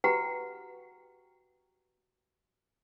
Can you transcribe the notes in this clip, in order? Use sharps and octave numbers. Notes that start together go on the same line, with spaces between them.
F#4 G4 B4 F#5 G5 A#5